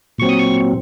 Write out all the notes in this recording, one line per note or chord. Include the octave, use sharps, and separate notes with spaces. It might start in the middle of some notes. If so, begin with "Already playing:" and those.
A#2 F#3 C4 C#6
D#6
C#6